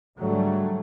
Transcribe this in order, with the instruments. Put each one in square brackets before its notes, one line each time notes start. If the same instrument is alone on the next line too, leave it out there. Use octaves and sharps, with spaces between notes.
[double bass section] G#2 D3 F#3 G3 A3